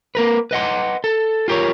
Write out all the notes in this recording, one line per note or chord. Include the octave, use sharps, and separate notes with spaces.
A#3 A#4 B4
B4 D#5 F#5 C6
A4
F4 G4 A#4 C#5